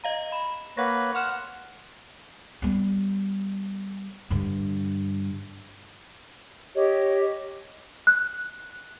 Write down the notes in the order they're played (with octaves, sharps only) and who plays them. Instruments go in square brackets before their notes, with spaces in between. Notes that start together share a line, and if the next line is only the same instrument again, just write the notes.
[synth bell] D#5 F5 A#5
B5
[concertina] A#3 B4 C#5 [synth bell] F#5 A#6
[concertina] F#5 [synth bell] C6 F6 E7
[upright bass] G3 B3
G2 D3
[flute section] G4 C#5 D#5
[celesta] F#6